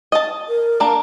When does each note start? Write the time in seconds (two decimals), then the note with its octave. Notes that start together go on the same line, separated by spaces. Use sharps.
0.12 D#5 A5
0.49 A#4
0.80 A#3 D4